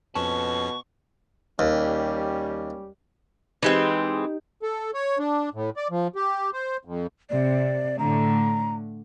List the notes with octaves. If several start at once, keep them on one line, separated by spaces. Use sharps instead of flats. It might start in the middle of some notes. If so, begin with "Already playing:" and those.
F2 B2 C#4 B4 A5 C#6
D#2 G3 C#4 G4
E3 G#3 C4 D#4 G4
A4
C#5
D4
A2
D5
F3
G4
C5
F2
C3 D5
A2 D3 A3 A#5